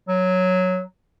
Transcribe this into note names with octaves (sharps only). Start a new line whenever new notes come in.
F#3